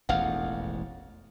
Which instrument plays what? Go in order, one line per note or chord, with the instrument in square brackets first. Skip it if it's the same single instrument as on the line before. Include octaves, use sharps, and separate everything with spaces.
[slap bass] E1 A1 F2 [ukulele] F5 F#5